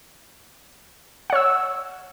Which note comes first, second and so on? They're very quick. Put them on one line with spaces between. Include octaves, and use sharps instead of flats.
F#5 C#5 E6